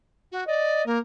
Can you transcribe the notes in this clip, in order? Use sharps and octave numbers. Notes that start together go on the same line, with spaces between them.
F#4
D5 D#5
A#3 A#4